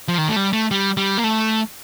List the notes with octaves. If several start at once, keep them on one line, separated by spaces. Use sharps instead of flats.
F3
D#3
A3
G3
A3
G3
G3
A#3
A3